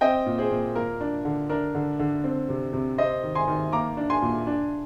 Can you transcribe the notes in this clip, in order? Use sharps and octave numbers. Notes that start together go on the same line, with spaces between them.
C4 D#5 G5
A#2
G#4 C5
A#2
A#3 A#4
D4
D3
D4 A#4
D3
D3
C4
C3
C3
C4 C5 D#5
D#3
G#5 C6
D#3
A#3 A#5 D6
D4
G#5 C6
A#2
D4